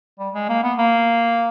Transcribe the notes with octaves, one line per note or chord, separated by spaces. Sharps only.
G3
G#3
A#3
B3
A#3